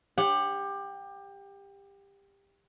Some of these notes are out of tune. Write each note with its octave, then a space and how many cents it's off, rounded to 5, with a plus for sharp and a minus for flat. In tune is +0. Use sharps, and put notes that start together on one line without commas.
G4 +20 F#5 -10